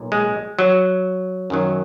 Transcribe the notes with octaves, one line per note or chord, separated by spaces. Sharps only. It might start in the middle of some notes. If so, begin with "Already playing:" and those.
Already playing: B1 A#2
G#3
F#3
F#2 D#3 F#3